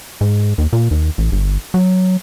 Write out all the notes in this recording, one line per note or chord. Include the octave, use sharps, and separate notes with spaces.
G#2
D#2
A#2
D#2
A1
G1
F#3